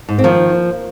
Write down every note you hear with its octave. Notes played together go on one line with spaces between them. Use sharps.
G#2
C4
D#3 F3 A#3